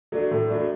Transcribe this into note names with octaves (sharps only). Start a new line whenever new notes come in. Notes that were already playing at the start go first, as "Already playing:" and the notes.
F#3 A3 D4
A2
F#3 A3 D4